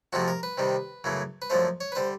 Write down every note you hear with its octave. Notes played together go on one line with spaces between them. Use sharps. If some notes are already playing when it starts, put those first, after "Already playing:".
F2 C3 F3 A3 F#4
A#4
B4
C3 D#3 G3
F#2 C#3 E3 A3
B4
F#2 D3 F3 A3 C5
C#5
B4
D3 G3 C5